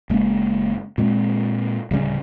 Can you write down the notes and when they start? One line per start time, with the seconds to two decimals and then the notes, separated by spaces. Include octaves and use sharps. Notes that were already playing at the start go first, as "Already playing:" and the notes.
0.10 F#1 G#3 A#3 C#4
0.98 A#2 G#3 C4
1.91 D1 C#3 G3 C#4